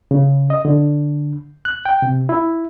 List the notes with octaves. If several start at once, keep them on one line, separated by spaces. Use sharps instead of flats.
C#3
D#5
D3
F#6
G5
C3
E4